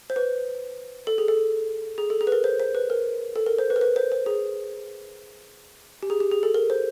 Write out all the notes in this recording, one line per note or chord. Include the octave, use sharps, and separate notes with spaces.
C5
B4
A4
G#4
A4
G#4
A4
G#4
B4
A#4
C5
C5
B4
A#4
A4
A#4
C5
B4
A#4
B4
C5
C5
G#4
G4
G#4
G4
G#4
A4
A#4
C5